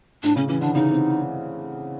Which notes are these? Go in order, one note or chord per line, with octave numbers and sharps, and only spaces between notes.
A2 D4
C#3 C#4
E3 C#4
D3 D4
C#3 D#4
C3